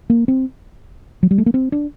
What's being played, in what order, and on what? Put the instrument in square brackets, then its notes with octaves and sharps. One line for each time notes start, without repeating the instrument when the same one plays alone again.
[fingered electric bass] A#3
C4
F#3
G3
A3
A#3
C4
D4